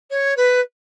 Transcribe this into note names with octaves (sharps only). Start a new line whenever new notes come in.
C#5
B4